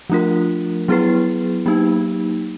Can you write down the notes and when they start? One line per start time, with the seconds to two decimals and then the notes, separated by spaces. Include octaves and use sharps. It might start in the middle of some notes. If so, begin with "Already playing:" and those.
0.10 F3 A3 D4 F4 A#4
0.88 F#3 B3 E4 G#4 B4
1.66 F#3 A#3 D#4 G4